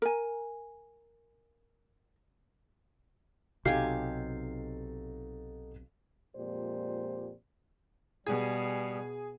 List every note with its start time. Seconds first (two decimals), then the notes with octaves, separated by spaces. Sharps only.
0.02 A#4 G#5
3.65 B1 C3 D#4 F#4 G4 A4 F5 G#5
6.35 F2 A#2 G#3 G4 C5 D5
8.26 B2 G3 G#4